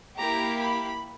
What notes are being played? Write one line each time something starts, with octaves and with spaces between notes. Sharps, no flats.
A#3 E4 G4 A#5
B5